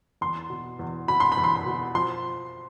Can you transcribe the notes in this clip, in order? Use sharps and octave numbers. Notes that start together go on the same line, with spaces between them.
E2 C6
B2
E2
B2 B5
C6
B5
E2
C6
B5
B2
F3 C6